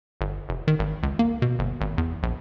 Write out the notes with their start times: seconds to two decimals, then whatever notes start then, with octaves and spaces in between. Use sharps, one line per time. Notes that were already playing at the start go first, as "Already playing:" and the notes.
0.21 G1
0.49 F1
0.68 D#3
0.79 G#1
1.03 C#2
1.19 A#3
1.42 B2
1.59 G1
1.81 G#1
1.98 E2
2.23 A#1